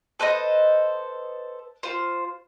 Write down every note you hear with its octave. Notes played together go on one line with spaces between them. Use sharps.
A4 B4 C5 D#5
F4 C5